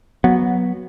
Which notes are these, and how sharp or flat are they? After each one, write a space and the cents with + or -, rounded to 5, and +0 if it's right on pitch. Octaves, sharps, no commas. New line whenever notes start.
F#3 -5 B3 -15